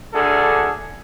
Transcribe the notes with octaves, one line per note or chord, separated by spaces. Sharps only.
D2 D3 D4 G#4 A4